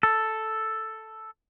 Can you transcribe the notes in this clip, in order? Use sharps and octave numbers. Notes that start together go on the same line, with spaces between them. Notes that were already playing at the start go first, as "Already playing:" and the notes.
A4